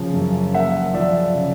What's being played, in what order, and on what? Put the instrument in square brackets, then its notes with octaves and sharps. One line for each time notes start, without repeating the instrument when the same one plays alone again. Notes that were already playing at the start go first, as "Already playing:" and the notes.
Already playing: [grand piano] C#3 F3
F#2
A#3 E5 F#5
F3 D5 E5
C#3